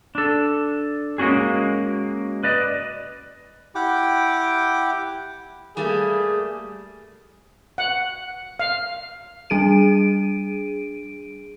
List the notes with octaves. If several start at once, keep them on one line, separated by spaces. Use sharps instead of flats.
D4 A4
G#3 A#3 C#4 F#4 G#4
B4 D5 D#5
E4 G4 F#5 G5 D6
G3 A3 A#3 G#4
F#5
F5
G3 D4 G#4 D7 D#7